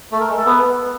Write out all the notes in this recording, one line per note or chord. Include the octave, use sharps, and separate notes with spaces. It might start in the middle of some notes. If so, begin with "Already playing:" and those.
A3
A#4
G#3
A4
B3